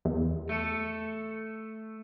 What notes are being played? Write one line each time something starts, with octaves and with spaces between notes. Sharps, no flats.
E2
A3 A4